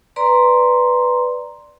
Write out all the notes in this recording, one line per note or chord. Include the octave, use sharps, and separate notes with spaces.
B4 D5 A#5 C6